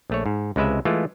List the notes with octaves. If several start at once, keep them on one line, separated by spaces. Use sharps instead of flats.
A#1 A3 C#5
G#2
C#2 C3 G#3 B4 E5
E3 G#3 A3 F4